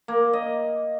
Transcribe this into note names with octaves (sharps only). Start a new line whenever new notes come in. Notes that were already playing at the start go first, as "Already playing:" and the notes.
A#3
D#5